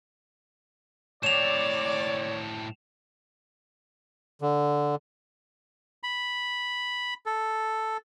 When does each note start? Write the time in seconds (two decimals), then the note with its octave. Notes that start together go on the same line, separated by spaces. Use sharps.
1.23 A2 C4 C#5 D5 E7 F7
4.41 D3
6.03 B5
7.26 A4